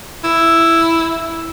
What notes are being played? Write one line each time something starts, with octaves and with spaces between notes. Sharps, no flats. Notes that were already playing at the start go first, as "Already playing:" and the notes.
E4